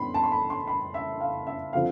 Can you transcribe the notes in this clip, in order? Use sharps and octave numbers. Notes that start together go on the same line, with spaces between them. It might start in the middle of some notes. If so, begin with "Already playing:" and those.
Already playing: A2 E3 B3 D4 B5 C6
A5
C6
B5
C6
B5
E5
F5
E5
D3 F3 C4 F5